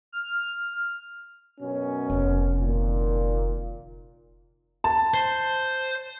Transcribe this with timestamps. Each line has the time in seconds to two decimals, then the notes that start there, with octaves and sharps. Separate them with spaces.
0.12 F6
1.60 F#2 B2 C#4
2.10 F1 C4
2.60 A#2 D#3
4.84 A5
5.14 C5